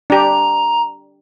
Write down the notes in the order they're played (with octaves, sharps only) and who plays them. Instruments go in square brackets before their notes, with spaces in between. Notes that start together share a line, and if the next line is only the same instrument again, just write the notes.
[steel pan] D4 G4 [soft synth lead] A#5